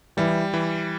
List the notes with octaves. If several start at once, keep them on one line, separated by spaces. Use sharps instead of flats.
E3 G3
E3